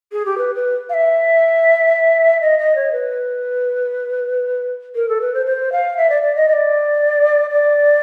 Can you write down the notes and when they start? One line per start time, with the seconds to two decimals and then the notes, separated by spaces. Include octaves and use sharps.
0.12 G#4
0.25 G4
0.37 B4
0.54 B4
0.89 F5
0.93 E5
2.41 D#5
2.58 D#5
2.75 C#5
2.92 B4
4.95 A#4
5.08 A4
5.21 B4
5.34 C5
5.46 C5
5.72 F5
5.97 E5
6.09 D5
6.22 D5
6.35 D#5
6.48 D#5
6.52 D5
7.50 D5